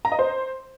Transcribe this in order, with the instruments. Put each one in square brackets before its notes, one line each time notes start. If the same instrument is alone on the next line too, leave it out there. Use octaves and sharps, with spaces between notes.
[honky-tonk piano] A#5
D#5
C5